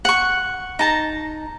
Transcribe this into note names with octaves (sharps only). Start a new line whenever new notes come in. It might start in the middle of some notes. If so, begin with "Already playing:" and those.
F#5 C#6
D#4 A5 A#5